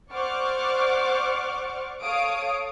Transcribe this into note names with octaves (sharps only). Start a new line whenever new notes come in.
C5 D5 F#5 C#6 D6 F6
A4 C#5 F5 D#6 D7